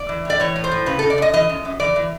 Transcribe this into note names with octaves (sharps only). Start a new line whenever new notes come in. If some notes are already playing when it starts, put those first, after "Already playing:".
Already playing: D5
E3
A2 D5
E3 C#5
A2
C5
A2
C#3 B4
C#3 A4
D5
F#2 D#5
E3 D#5
F#2
F#2
E3 D5
E3